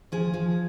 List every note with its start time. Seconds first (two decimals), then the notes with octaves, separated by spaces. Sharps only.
0.12 F3 G#4
0.34 F3